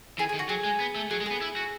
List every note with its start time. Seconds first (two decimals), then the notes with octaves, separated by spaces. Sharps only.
0.18 E3 G#4
0.29 G#4
0.34 D#3
0.39 F#4
0.49 F#3 G#4
0.64 G#3
0.80 B3
0.96 A3
1.11 F#3 G#4
1.21 G#3
1.26 B3 G#4
1.41 E4
1.57 F#4